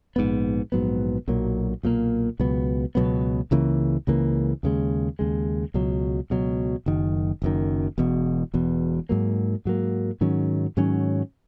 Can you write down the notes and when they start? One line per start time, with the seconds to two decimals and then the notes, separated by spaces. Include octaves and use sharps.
0.16 A#1 G#2 F#3 B3
0.72 A#1 G#2 F#3 B3
1.28 B1 A#2 F#3 A#3
1.83 B1 A#2 F#3 A#3
2.40 C#2 B2 F#3 B3
2.95 C#2 B2 F#3 B3
3.51 C#2 C#3 E3 A#3
4.07 C#2 C#3 E3 A#3
4.63 D#2 C#3 G#3
5.19 D#2 C#3 G#3
5.74 C#2 B2 F#3
6.30 C#2 B2 F#3
6.86 F#1 F#2 D#3
7.42 F#1 F#2 D#3
7.98 E1 E2 B2
8.54 E1 E2 B2
9.09 G#2 F#3 A#3
9.65 G#2 F#3 A#3
10.21 G#2 D#3 F#3 C#4
10.77 G#2 D#3 F#3 C#4